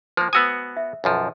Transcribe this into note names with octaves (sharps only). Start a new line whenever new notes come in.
F3 A#3 C5
B3 F#4 G#5 D#6 E6
E5
B1 F#2 F3